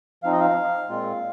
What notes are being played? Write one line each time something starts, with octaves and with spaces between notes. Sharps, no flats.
F3 C4 D#4 F5
D#5
F5
A#2 G#3 C4 F4